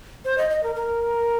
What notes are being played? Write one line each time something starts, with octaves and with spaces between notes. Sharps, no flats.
C5
D#5
D#5
A#4
A#4